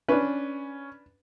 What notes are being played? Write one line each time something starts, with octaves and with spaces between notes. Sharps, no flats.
C#4 D4 B4